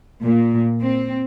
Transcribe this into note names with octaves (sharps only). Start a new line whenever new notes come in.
A#2
C4